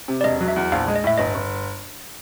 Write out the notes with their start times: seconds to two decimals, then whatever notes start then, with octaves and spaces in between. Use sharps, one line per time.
0.08 C3
0.21 D5
0.24 E1 D#5
0.41 F#3
0.48 E5
0.56 E2
0.72 A#1 F5
0.88 G#3
0.96 D#5
1.04 A2 E5
1.18 G1 D#5
1.35 G1